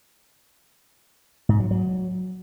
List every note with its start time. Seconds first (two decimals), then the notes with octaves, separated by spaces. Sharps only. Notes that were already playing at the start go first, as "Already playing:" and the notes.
1.49 G#2
1.60 F#3
1.71 F#3